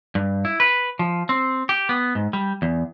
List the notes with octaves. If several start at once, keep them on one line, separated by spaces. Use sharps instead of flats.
G2
E4
B4
F3
C4
G4
B3
G#2
G3
E2